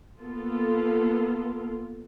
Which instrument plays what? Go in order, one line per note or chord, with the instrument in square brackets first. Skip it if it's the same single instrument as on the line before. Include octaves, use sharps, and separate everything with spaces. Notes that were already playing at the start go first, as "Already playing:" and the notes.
[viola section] A#3 B3 F4 A4